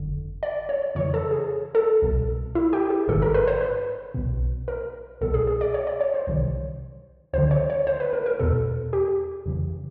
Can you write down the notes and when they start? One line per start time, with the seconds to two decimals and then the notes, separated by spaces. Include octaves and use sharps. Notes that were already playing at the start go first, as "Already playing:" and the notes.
Already playing: G1 F2 D3
0.43 D5
0.69 C#5
0.95 F2 C#3 E3 C#5
1.14 A4
1.31 G#4
1.75 A4
2.02 C2 B2
2.55 E4
2.73 G4
2.90 G#4
3.08 G#1 G#2 D#3 A4
3.22 A#4
3.34 B4
3.48 C5
3.61 B4
4.14 B1 B2
4.68 A#4
5.21 C2 B2 A4
5.34 G#4
5.47 G#4
5.61 D5
5.74 C#5
5.87 D5
6.01 C#5
6.14 C5
6.27 C2 C3 D#3
7.33 D2 D3 C5
7.51 C#5
7.70 C#5
7.87 C5
8.00 B4
8.13 A#4
8.26 A#4
8.40 E2 B2 A4
8.93 G4
9.46 F2 C#3 E3